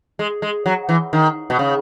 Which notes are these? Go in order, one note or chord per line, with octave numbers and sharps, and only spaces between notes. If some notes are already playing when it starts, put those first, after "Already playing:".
G#3
G#3
F#3
E3
D#3
B2
C#3